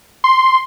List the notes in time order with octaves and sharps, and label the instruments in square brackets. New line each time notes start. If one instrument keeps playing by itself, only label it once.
[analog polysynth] C6